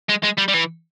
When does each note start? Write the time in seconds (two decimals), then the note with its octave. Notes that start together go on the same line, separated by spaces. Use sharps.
0.09 G#3
0.23 G#3
0.38 G3
0.48 G3
0.54 E3